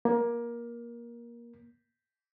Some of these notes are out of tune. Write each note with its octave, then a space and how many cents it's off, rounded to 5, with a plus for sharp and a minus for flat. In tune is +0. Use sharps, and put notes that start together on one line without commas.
A#3 +20